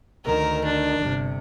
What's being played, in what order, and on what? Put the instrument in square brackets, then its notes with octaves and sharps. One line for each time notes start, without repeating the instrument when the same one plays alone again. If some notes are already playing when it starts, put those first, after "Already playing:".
[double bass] D2 D#3 [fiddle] A#4
[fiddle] D4
[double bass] G1 C3